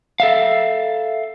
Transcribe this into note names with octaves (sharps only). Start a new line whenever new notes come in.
A4 E5 F5